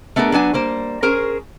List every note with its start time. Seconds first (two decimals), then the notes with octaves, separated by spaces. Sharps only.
0.16 A3 B3 D4 G#4 A#4
0.32 F#3 B3 D4 G#5
0.54 G3 A#3 C5
1.03 C#4 G#4 A#4 C5